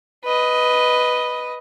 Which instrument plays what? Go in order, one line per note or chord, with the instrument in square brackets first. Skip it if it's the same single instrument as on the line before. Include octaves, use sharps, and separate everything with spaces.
[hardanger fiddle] B4 D#5